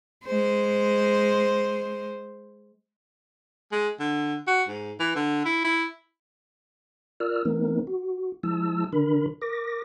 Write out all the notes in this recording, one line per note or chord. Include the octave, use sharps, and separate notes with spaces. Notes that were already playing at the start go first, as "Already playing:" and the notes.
G#3 C5
G#3
D3
F#4
G#2
E3
D3
E4
E4
F4 A#4 D5 E6 F6
E3 A3 B3 C4 D#4 A#4
F#4
F3 G#3 E4 A5 E6
D3 D#3 D4 A#4 B5
A#4 D6 A#6